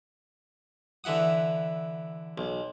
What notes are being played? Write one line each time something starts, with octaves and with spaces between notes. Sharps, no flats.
D3 E3 E4 F#5 D#6
B1